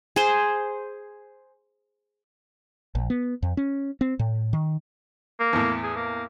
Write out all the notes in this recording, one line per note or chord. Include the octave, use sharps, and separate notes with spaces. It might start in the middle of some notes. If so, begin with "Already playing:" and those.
G#4 C5
A#1
B3
F2
C#4
C4
A2
D#3
A#3
E2 A2
G#4
A#3